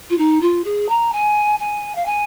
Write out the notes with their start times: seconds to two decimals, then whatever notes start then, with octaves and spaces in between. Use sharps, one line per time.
0.10 F4
0.18 D#4
0.41 F4
0.64 G#4
0.88 A#5
1.12 G#5
1.59 G#5
1.95 F5
2.05 G#5